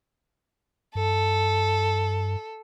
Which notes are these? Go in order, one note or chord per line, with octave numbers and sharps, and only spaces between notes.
G2 A4